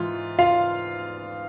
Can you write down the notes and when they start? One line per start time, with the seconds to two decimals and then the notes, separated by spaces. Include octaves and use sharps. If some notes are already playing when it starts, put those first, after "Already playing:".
Already playing: G#2 E3 F4
0.39 F4 F5